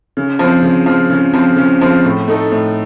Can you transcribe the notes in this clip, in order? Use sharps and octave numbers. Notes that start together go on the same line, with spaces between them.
C#3
F3
C4
C#3
F3 C4
C#3
F3 C4
C#3
F3 C4
A2
A3 D#4 A4
A2